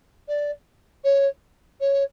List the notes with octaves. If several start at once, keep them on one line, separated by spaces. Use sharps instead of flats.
D5
C#5
C#5